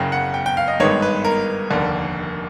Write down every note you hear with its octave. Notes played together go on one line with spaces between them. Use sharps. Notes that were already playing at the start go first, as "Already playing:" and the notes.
Already playing: F#1 F#2 C#3 G5
F#5
G5
G5
F5
D#5
G#1 G2 D#3 G#3 B3 C#5
B4
A#4
F1 D#2 D3